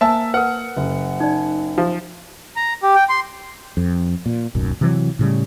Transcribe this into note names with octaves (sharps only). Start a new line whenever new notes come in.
A#3 C5 E5 G#5 A5 E6
A#4 B4 F#5
F#1
D#4 D5
F3
A#5
G4
G5
C6
F2
A#2
D1 B1 F#2
C3 E3 F#3
A2 C#3 G3